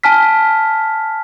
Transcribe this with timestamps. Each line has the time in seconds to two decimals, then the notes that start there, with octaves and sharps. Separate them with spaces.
0.04 G#5 A5 F6 B6